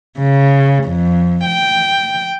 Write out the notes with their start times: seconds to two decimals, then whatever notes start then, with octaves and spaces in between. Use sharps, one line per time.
0.18 C#3
0.85 F2
1.45 G5